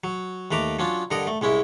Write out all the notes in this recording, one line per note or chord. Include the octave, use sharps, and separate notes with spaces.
F#3
D#2 A3 B4 A#5 D6
F#3 C#4 D4 F4
G2 D3 A#4 D#5 F#5 D#6
A3
C2 G#3 C#4 E4